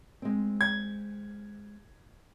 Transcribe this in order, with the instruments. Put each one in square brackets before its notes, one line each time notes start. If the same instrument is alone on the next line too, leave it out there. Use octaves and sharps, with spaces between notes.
[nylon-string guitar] G#3 C4
[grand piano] G#6